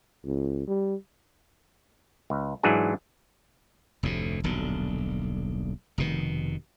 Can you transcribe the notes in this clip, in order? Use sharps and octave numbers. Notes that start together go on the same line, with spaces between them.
C#2
G3
C#2
G#2 E3 F#3 D4 G#4
F1 D2 A2
D#1 B1 D3
F1 B2 D#3